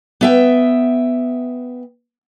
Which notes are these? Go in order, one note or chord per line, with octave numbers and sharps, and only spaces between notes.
B3 E5 G5